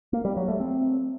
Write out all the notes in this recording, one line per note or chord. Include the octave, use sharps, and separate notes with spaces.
A#3
G3
F#3
A3
C4